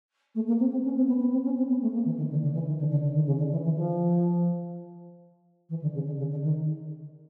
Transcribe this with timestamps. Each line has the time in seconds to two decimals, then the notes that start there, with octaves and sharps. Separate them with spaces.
0.34 A3
0.47 A#3
0.59 C4
0.71 C4
0.84 C#4
0.96 C4
1.07 B3
1.19 B3
1.31 C4
1.43 C#4
1.57 C4
1.68 B3
1.81 A3
1.93 A#3
2.04 E3
2.16 D#3
2.30 D3
2.42 D3
2.53 E3
2.65 D#3
2.78 D3
2.90 D3
3.03 D3
3.14 D#3
3.26 C#3
3.38 D3
3.51 E3
3.63 E3
3.75 F3
5.69 E3
5.81 D3
5.93 C#3
6.06 D3
6.17 C#3
6.30 D3
6.43 D#3